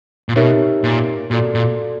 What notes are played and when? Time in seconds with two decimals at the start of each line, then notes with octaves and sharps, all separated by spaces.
0.29 A#2
0.36 B2 D#4 G4 A#4 C#5 E5
0.84 A#2
1.31 A#2 F#4 A4 D5
1.55 A#2